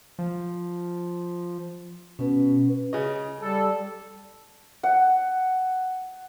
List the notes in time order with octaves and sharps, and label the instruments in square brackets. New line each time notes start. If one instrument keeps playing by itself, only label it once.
[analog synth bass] F3
[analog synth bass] B2 [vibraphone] C#4 B4
[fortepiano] C#3 D#5
[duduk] G3 [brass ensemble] A4
[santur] F#5